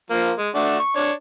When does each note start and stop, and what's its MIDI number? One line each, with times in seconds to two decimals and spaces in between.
0.10 0.32 53
0.10 0.32 58
0.39 0.49 56
0.55 0.77 57
0.55 0.77 62
0.55 0.77 66
0.80 0.93 85
0.96 1.11 62
0.96 1.11 73